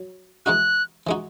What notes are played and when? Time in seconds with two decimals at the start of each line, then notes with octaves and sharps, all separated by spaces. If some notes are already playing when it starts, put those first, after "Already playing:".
Already playing: F#3
0.46 E3 G#3 D#4 F#4 F#6
1.07 E3 G#3 D#4 F#4